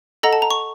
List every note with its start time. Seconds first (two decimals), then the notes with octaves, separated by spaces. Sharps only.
0.23 A4 D#5 F#5 A#5
0.33 A5
0.42 A#5
0.51 C#6